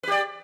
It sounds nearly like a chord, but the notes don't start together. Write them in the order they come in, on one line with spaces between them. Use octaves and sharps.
B4 G4 D5